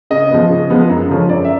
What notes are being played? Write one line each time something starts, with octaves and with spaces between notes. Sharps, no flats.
C#3 D#5
F3 G#3 B3
C#3
F3 G#3 B3
F#2
D3 F3 G#3 C#4
F#2 D5
E5